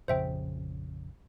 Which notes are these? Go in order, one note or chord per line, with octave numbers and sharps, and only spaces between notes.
A#1 F2 C#3 C5 E5 G5